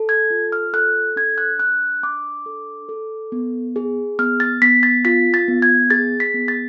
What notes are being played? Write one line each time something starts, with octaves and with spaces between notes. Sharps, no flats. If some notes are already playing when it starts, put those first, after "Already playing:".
Already playing: A4
G#6
F4
F6
A4 F#6
D4 G#6
F#6
D4 F#6
D4 D6
A4
A4
B3
G#4
B3 F6
A6
B3 B6
A6
F4 B6
A6
B3
G#6
G#4 A6
B6
B3
A6